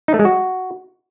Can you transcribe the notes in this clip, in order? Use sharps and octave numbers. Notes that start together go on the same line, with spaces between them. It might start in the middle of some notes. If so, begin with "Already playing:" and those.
D#4
A3
G#3
F#4